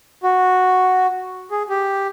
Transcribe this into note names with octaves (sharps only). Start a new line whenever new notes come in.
F#4
G#4
G4